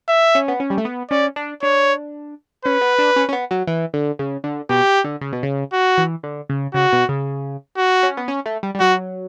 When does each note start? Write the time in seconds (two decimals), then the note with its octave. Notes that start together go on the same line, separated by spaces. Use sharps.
0.08 E5
0.35 C#4
0.48 B3
0.60 C#4
0.70 G3
0.78 A3
0.85 B3
1.11 C#4 D5
1.36 D4
1.63 D4 C#5
2.65 C#4 B4
2.81 B3
2.99 D4
3.16 C#4
3.29 C#4
3.33 B3
3.51 F#3
3.67 E3
3.94 D3
4.19 C#3
4.44 D3
4.69 B2 G4
5.04 D3
5.21 C#3
5.32 B2
5.43 C#3
5.73 F#4
5.98 E3
6.23 D3
6.49 C#3
6.74 C#3 F#4
6.93 B2
7.09 C#3
7.77 F#4
8.03 C#4
8.17 B3
8.28 C#4
8.46 A3
8.63 G3
8.75 G3
8.80 F#3 F#4